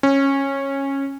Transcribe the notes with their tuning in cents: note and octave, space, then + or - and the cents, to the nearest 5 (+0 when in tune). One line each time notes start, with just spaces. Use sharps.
C#4 -15